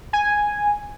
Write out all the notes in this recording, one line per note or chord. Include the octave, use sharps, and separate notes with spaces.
G#5